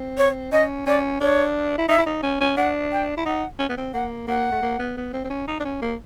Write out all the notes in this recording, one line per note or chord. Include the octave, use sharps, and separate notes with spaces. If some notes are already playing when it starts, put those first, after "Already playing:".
Already playing: C4
C#5
C#4 D#5
C#4 D5
D4 C#5
E4
D#4 E5
E4
D#4
C#4
C#4
D4 F#5
G5
E4
D#4 F#5
C#4
B3
C4
A#3 F#5
A#3 F#5
A3
A#3
B3
B3
C4
C4
C#4
D#4
D4
C#4
A#3